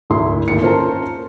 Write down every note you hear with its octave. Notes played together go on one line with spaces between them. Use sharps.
G#1 D2 E4 C6
G#1 D#2 C#7
C#4 F4 A#4 C5 A5 A#5